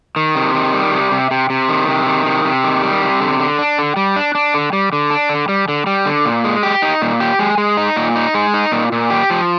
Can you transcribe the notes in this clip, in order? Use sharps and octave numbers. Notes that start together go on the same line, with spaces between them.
D#3
C3
D#3
G3
C3
C3
C3
C3
D#3
C3
D#3
C3
C3
D#3
G3
C3
D3
D3
D4
D3
G3
D4
D4
D3
G3
D3
D4
D3
G3
D3
G3
D3
A#2
G#3
G4
D#4
A#2
G4
G#3
G#3
D#4
A#2
D#4
G#3
D#4
A#2
A#2
G4
F3